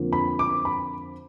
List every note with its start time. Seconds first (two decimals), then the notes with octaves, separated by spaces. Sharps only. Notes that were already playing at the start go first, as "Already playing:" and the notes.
Already playing: F2 D3 F3 A#3
0.13 B5
0.39 D6
0.65 B5